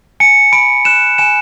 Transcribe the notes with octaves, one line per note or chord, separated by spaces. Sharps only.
G#5 C#7
B5 D7
F#6 E7
G#5 E7